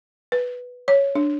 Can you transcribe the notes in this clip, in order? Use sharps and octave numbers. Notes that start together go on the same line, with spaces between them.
B4
C#5
D4